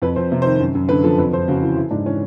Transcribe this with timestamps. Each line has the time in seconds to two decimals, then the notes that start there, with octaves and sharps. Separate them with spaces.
0.02 F2 B4
0.16 F2 C5
0.32 C3
0.42 D#3 C5
0.60 F#2
0.75 F#2
0.89 D3 B4
1.04 F3 A4
1.18 F2 B4
1.33 F2 C5
1.48 C#3 F#4
1.62 E3
1.77 E3 E4
1.91 G#2 D4
2.06 E3 C#4